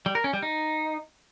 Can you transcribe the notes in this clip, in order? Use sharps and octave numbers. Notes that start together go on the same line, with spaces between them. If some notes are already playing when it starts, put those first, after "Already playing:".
G3
A#4
C#4
G3
D#4